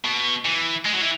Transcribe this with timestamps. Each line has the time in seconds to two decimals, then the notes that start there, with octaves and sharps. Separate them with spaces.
0.05 B2
0.45 E3
0.85 G#3
0.93 F#3
1.01 E3